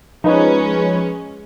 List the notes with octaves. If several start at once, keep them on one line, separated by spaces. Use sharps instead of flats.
F3 G#3 C#4 D#4 B4 C#5